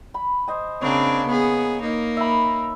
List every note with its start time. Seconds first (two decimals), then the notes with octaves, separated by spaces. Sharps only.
0.14 B5
0.47 C5 D#5 G#5
0.81 C#3 A#3 C4 D4 B4 C#5
1.27 B3 G#4
1.82 A#3 D#4
2.17 E5 B5